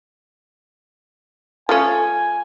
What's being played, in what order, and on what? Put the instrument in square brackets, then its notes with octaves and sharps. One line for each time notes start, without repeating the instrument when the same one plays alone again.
[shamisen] F3 A3 C#4 [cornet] G#5